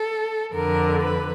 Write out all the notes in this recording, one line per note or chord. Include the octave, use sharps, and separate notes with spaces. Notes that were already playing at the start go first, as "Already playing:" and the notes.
Already playing: A4
F2 D3 A#4
B4